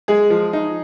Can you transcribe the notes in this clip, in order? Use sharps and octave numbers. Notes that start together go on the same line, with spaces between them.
G#3 G#4
F3
D#4